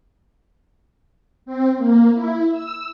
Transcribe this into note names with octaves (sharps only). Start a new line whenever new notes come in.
C4
A#3
E4
E6